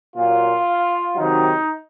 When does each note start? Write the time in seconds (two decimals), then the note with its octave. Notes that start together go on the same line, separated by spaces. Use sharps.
0.16 A#2 F#3 F4
1.16 C3 D#3 F#3 D#4